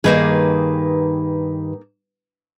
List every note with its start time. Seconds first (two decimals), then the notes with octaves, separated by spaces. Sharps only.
0.04 G2 D#3 A#3 D#4 G#4 B4